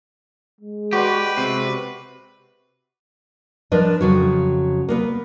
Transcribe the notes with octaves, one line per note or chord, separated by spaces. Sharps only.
G#3
F#4 G4 B4 D5 C6
C3
F3 D4 A#4 B4 D#5
F2 C#3 F#3
A#3 B3 B4